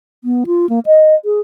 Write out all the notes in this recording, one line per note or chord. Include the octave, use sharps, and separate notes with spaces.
B3
F4
A#3
D#5
G#4